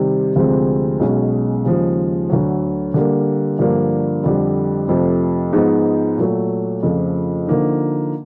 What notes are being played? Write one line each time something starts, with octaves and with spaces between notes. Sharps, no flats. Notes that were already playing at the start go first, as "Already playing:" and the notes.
Already playing: C3 D#3 G3
D2 C3 F3 G#3 C4
B1 B2 G#3 C#4
D#2 C#3 F3 G#3
D2 D3 F#3
D3 G3 A#3
G2 D3 F3 A#3 D4
F2 D3 G3
F2 C3 F3 A3
G#2 F3 G#3 B3 D#4
A#2 F#3 A3
F2 C#3 F3 A3
D3 F3 A#3 D#4